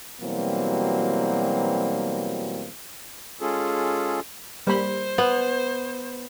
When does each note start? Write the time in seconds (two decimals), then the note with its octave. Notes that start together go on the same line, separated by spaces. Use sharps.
0.21 B2 E3 F#3 G3 A#3 C4
3.41 G#3 C#4 F4 G#4 A4
4.67 G3 A#3 C5 B5
5.18 B3